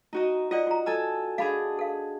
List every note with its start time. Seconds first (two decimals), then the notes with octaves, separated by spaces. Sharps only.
0.13 D#4 F#4 D#5
0.51 F4 D5 D#5 F#5
0.67 F4 A#5
0.86 A4 G#5 A#5 E6
1.38 D4 G#4 F5 B5
1.79 A4 F5